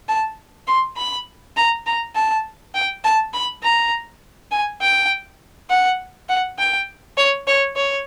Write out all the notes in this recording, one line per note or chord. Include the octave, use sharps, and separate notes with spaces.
A5
C6
B5
A#5
A#5
A5
G5
A5
B5
A#5
G#5
G5
F#5
F#5
G5
C#5
C#5
C#5